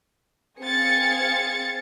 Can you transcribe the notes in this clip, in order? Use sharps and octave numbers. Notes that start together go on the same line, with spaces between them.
C4 G#4 F5 G#6 A6 C#7